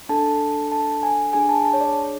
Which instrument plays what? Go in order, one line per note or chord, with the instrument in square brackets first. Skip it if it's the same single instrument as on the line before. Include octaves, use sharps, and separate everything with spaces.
[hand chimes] D4 A4 A5
A5
G#5
D4 G#4 G#5
A5
A5
C#5
D5